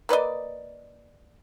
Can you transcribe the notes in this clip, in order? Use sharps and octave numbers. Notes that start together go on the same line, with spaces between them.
A#3 B4 D5 D#5